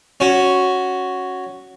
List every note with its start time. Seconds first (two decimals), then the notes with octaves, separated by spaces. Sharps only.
0.20 C#4 F#4